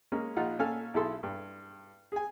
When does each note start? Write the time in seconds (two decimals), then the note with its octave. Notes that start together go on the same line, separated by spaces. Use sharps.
0.12 G#3 A#3 C#4
0.36 A#1 D#4 F4 F#5
0.59 A#2 C#4 A4 F5 G#5 F6
0.94 B1 E4 G#4 A4 C6
1.23 G2
2.12 G#4 G#5